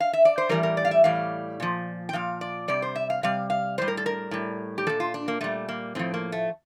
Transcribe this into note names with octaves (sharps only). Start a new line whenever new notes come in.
F5
E5
D5
C5
A2 E3 G3 A#4
A#4
D5
F5
E5
A2 E3 G3 F5
A#2 F3
G5
A#2 F3 F5
D5
C3 G3 D5
C5
E5
F5
C3 G3 F5
F5
A2 G3 C5
A#4
A4
A#4
A2 G3
G4
A#2 G3 A4
F4
D4
A#3
A#2 G3 A3
A#3
A2 F3 C4
A#3
A3